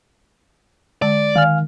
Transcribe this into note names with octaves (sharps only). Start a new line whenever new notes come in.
D3 G#3 D5 A5
D#3 F5 G#5 F6